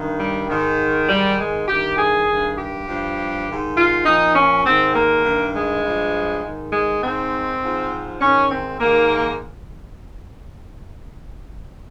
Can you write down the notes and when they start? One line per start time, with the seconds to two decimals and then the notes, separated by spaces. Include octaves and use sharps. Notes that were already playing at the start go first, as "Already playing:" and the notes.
Already playing: G2 D#3
0.18 G3
0.49 G#2 D#3
1.08 G#2 D#3 G3
1.38 G#3
1.68 G2 D#3 G4
1.97 G#4
2.27 G2 D#3
2.57 G4
2.86 G2 F3
3.46 G#2 D#3
3.75 F4
4.05 A#2 F3 D#4
4.35 C#4
4.65 G#2 D#3 C4
4.93 A#3
5.24 G2 D#3
5.54 G#3
5.83 G2 F3
6.42 G#2 D#3
6.72 G#3
7.01 G#2 D#3 C4
7.61 G#2 F3
8.20 G#2 D#3 C#4
8.50 C4
8.80 G#2 D#3 A#3